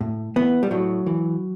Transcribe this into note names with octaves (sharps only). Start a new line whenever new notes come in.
A2
E3 B3
G3
A2 F#3
E3